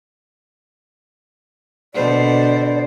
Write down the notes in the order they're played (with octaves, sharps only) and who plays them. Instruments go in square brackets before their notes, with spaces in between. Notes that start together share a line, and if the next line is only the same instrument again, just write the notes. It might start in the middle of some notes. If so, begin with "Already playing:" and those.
[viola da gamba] B2 D3 C5 [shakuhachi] D5